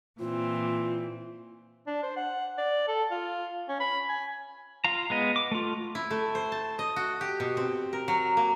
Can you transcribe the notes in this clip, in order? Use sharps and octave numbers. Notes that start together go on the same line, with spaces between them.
A#2 E3 C4 F4
D4
C5
F#5
D5
A4
F4
C#4
B5
G#5
F4 F5 A#5
G#3 B3 D#5
D6
A3 F4
E4
A3
C5
A5
D#5
F#4
G4
B2
C4
A#4
F#3
A#3